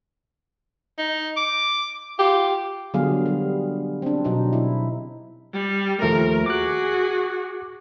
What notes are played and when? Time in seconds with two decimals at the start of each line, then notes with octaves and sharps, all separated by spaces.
0.99 D#4
1.37 D6
2.19 F4 G4
2.94 D3 F#3 G3 B3 G#4 F5
3.26 G3
4.02 C4 D4
4.25 B2 F#3 D#4
4.53 E4
5.54 G3
6.02 D#2 F3 A3 A#4
6.46 F#4 G#4 D6 F#6